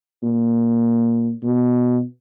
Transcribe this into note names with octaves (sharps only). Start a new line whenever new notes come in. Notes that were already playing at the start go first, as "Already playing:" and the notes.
A#2
B2